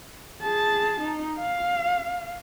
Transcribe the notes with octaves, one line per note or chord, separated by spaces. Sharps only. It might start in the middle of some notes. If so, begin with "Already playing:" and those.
G#4 A5
D#4
F5